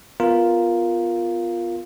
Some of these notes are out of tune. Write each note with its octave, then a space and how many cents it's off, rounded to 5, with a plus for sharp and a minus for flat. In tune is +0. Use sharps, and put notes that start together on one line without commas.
B3 +0 F4 +0 A#4 +0